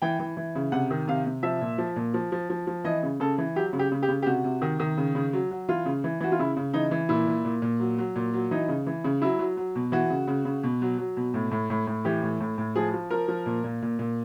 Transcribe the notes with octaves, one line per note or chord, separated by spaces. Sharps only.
E3 G5
E3
E3
C#3
C3 F#5
D#3
C3 F5
C3
F3 E5
A#2
F3
A#2
F3
F3
F3
F3
E3 D#5
C#3
C#3 A4
E3
F#3 G4
C#3
G4
C#3
G4
C#3
G4
C3 F#4
C3
D#3
D#3
C#3
C#3
F#3
F#3
E3 F4
C#3
E3
E3 F#4
F4
C#3 E4
C#3
E3 D#4
E3
A#2 E4
A#2
A#2
A#2
F#3
F#3
A#2
F#3
E3 D#4
C#3
E3
C#3
F#3 E4
F#3
F#3
B2
E3 F#4
C#3
C#3
C#3
B2
F#3
F#3
B2
A2
A2
A2
A2
E3 G4
A2
A2
A2
F3 G#4
F3
F3 A#4
F3
A#2
A#2
A#2
A#2